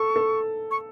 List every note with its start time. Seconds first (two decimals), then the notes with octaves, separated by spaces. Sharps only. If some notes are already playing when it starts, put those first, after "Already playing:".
Already playing: A4 C#6
0.16 A4
0.71 C#6